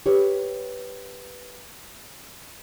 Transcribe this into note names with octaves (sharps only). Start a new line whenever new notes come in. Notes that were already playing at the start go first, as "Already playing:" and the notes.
G4 B4 C#5